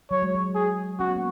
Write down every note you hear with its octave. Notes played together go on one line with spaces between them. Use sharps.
F#3 C#5
G#3
F#3
G#4
C#4 F#4
B3
A#3